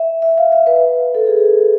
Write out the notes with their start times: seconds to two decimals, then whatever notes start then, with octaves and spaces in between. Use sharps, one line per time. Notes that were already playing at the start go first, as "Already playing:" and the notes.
Already playing: E5
0.22 E5
0.38 F5
0.52 E5
0.67 B4
1.15 A4
1.27 G#4